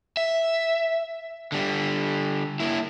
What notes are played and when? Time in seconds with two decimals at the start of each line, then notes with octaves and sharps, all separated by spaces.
0.17 E5
1.52 D3 G3
2.60 A#3 E4